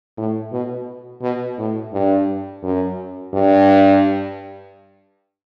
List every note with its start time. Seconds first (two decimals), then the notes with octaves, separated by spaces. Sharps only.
0.18 A2
0.52 B2
1.22 B2
1.58 A2
1.93 G2
2.63 F#2
3.33 G2